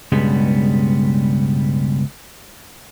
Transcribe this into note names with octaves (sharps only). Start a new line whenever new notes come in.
C#2 G2 B2 G3 G#3 B3